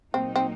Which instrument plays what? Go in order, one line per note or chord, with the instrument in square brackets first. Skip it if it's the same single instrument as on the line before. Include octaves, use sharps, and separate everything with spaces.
[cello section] A#2 F#3 A#3 D#4 [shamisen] C4
[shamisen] C4